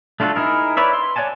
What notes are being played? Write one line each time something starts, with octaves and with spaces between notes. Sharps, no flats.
A3 D4 F4 F#4 A4
D#4 E4 G#4 A#4
E4 B4 C#5 D5 E5
C6
C#5 D5 F#5 G#5 A5